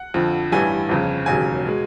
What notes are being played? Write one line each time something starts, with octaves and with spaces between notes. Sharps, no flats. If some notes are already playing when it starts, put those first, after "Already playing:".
Already playing: F#5
F2 D3 F3
A1 G2 E3 G3 G#5
G1 F2 C#3
E1 D#2 C#3 F#3 G#5
B2 G#3